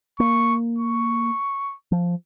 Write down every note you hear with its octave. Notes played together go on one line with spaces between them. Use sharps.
A#3 C#6
C#6
F3